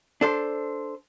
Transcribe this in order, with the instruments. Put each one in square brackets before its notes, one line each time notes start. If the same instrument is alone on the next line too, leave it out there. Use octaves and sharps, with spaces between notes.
[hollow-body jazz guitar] D4 A4 C5